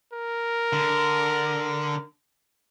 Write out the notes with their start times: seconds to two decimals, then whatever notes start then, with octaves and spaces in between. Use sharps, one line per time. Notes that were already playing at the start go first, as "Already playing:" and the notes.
0.13 A#4
0.73 D3